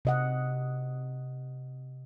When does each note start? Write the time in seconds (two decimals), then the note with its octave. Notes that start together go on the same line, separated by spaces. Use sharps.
0.05 C3 D#5 F#5